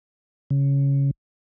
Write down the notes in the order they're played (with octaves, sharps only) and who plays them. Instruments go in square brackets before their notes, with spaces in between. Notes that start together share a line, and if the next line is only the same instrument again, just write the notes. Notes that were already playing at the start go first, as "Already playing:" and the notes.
[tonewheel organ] C#3